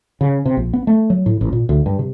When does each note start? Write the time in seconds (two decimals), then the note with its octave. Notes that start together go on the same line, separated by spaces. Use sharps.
0.21 C#3
0.46 C3
0.57 A#1
0.73 B3
0.87 A3
1.10 F#3
1.26 A2
1.41 A1
1.53 A#2
1.69 D2
1.86 G2
1.99 C3